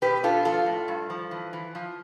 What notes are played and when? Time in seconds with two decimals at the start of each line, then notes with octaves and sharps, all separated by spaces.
0.02 B2 G4 B4
0.23 D4 F4 A4
0.45 F3 F4 A4
0.66 A2
0.88 G2
1.10 F3
1.31 E3
1.53 E3
1.75 F3